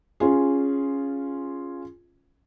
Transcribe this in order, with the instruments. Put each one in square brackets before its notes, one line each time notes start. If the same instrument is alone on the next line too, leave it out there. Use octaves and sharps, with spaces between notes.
[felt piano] C#4 F4 G#4